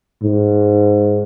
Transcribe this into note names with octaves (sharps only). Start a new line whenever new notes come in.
G#2